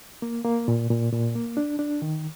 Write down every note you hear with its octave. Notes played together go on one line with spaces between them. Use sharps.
A#3
A#3
A#2
A#2
A#2
A#3
D4
D4
D#3